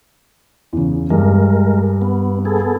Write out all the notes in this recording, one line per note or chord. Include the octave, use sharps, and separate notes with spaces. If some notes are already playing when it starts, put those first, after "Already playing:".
E2 C#3
G2 G#3 A#4
B3
B3 G#4 A4